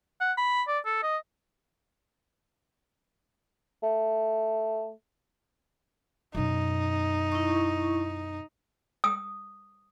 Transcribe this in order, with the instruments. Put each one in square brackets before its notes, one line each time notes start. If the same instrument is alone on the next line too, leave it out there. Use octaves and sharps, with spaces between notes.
[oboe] F#5
B5
D5
A4
D#5
[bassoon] A3
[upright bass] F#2 B2 [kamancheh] D#4
[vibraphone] E4 C#6
[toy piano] D#6